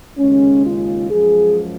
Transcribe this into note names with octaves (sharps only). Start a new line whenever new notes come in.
D#2 C#3 G#3 C#4
F4
F#2 F3 G#3 G#4